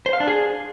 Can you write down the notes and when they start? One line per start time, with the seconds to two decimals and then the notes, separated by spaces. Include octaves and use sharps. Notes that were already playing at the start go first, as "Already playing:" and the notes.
0.06 C5
0.13 F5
0.20 D4
0.27 G#4